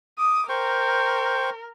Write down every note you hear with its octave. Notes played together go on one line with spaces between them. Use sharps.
D6 D#6
A#4 C5 G5 C#6